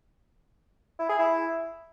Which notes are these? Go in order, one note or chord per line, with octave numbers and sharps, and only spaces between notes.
E4
G#4
E4